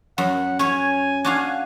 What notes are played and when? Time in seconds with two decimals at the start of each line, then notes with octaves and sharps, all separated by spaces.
0.18 F#2 F#5
0.59 C#4 C#5 G#5
1.25 D4 F#4 F5